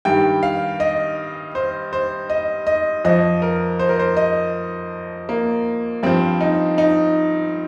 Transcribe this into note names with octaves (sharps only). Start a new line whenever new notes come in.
G2 D#3 G3 G5
F5
D#5
C5
C5
D#5
D#5
F2 F3 D#5
A#4
C5
A#4
C5
D#5
A#3
G2 F3 C4
D#4
D#4